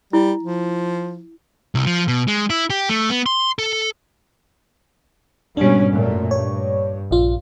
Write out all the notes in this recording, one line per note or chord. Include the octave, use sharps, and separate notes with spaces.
G3 E4
F3
C2
F3
B2
G#3
E4
G4
A3
B3
C6
A4
G#2 B2 G3 C#4 D4
F#2 A#2 A3
G2 C#5
A#1 F4